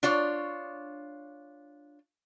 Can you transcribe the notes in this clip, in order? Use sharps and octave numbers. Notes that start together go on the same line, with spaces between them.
D4 F4 C#5